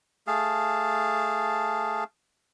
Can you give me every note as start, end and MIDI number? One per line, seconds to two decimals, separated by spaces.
0.27 2.04 57
0.27 2.04 68
0.27 2.04 77
0.27 2.04 81